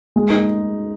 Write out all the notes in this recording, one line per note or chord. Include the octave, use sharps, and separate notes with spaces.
G#3
D#4